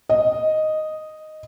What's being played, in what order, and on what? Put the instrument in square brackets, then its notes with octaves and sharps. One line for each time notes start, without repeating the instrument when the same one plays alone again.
[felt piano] D#5